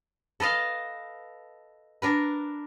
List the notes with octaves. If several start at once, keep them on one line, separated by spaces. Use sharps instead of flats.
A4 B4 D#5 F5
D4 A#4 B4